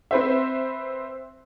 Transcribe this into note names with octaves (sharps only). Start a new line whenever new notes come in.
C4 B4 C5 E5